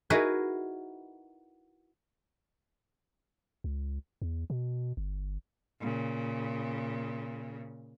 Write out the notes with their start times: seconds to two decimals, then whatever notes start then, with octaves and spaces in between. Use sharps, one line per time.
0.10 D#4 E4 F#4 G#4 A#4 B4
3.64 C#2
4.22 E2
4.50 B2
4.97 G1
5.80 A#2 C#3